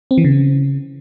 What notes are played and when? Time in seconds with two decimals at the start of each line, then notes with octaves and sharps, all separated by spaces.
0.11 C4
0.18 E3
0.24 C#3